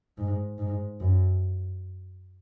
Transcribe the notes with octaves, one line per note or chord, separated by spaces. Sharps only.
G#2
G#2
F#2